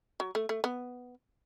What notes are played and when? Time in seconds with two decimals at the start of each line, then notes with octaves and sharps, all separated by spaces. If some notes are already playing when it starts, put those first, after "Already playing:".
0.20 F#3
0.35 A3
0.49 A3
0.64 B3